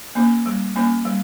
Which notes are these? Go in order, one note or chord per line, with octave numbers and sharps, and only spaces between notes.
A#3 C#4
G3
A#3 C#4
G3